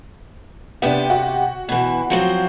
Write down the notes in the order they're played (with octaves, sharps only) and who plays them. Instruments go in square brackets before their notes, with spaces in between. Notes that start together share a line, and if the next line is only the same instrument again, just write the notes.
[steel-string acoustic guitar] C3 G4 [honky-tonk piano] B3 D4
[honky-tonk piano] F#4
[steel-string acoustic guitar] B2 E3
F3 F#3 C4